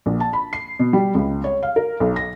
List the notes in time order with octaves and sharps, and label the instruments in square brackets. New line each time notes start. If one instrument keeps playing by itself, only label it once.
[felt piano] A#1
A5
B5
C7
B2
G3
C#2
C#5
F5
A#4
B1
A#6